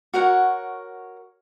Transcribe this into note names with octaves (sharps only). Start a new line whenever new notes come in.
F#4 A#4 C#5 F#5